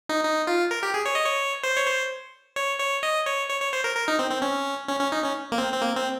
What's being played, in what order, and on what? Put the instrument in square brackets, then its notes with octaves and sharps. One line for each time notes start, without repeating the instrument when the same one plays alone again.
[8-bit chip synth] D#4
D#4
F4
A#4
G4
G#4
C#5
D#5
C#5
C5
C#5
C5
C#5
C#5
D#5
C#5
C#5
C#5
C5
A#4
A#4
D#4
C4
C4
C#4
C#4
C#4
D#4
C#4
A#3
C4
C4
A#3
C4